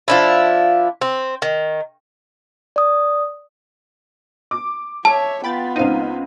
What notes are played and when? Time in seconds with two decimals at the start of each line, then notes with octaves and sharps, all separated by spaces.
0.08 F3 D4 E4
1.01 C4
1.42 D#3
2.76 D5 D#6
4.51 D6
5.05 C#5 E5 A5
5.44 B3 F4 G5 B5 A6
5.76 C#2 C4 D#4 F5 D#7